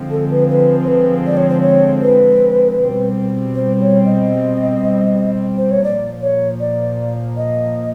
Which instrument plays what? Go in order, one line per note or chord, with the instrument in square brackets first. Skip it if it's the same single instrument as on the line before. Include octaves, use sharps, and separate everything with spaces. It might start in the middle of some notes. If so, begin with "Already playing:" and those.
Already playing: [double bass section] D3 F3 G#3 C4
[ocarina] A4
B4
B4
C5
B4
D5
C#5
C5
C#5
B4
[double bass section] B2 G3 C4
[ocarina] C5
C#5
D#5
C5
C#5
[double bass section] A#2 F3 A#3 [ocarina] D5
[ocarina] C#5
D5
D#5